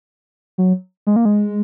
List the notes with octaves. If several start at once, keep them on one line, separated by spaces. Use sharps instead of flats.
F#3
G#3
A#3
G#3